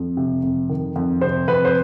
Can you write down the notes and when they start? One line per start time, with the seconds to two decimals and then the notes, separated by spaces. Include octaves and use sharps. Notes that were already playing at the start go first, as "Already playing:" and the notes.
Already playing: F2
0.17 C3
0.43 F2
0.69 D#3
0.96 F2
1.21 C3 C5
1.48 F2 B4
1.65 C5